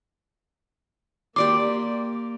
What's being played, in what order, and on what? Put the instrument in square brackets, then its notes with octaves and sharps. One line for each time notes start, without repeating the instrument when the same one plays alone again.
[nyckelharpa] A#3 [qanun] G4 D5 C6 [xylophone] D6